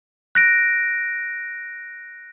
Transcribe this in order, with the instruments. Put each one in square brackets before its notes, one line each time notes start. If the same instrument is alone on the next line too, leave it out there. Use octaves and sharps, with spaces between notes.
[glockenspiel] F#6 A#6 D7